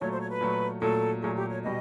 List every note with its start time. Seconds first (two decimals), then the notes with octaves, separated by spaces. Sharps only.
0.01 A#2 F#3 A3 C#5
0.11 C5
0.21 C#5
0.31 B4
0.41 A#2 F#3 A3
0.82 A#2 F#3 A3 A4
1.22 A#2 F#3 A3 G#4
1.36 G4
1.50 C#5
1.63 B2 G3 D#5